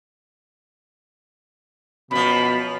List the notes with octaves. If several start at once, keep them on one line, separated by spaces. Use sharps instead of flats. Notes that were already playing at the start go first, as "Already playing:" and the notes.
F#2 B2 F3 B5